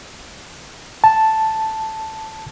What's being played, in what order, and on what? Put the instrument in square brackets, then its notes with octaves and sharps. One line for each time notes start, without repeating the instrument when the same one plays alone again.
[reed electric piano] A5